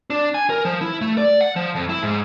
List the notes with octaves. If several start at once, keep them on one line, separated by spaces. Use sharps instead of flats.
D4
G#5
A#4
F3
E4
A3
D5
F#5
F3
F2
E4
G#2